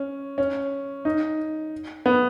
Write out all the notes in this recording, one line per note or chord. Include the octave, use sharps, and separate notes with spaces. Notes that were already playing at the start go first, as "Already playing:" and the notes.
Already playing: C#4
C#4
D#4
B3